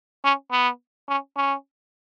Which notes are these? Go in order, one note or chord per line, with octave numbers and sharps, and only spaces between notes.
C#4
B3
C#4
C#4